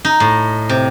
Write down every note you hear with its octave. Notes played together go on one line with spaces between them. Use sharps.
D#4
A2
C3